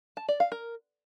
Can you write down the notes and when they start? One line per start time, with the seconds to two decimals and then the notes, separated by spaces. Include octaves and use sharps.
0.17 A5
0.28 D5
0.40 F5
0.52 A#4